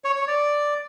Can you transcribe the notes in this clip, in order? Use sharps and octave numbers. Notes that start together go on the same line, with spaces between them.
C#5
C#5
D5